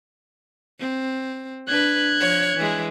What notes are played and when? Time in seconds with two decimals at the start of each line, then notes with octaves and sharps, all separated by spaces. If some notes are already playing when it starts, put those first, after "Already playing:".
0.80 C4
1.68 D4 B4 F#6 G#6
2.20 F3 C#5
2.56 E3 G#3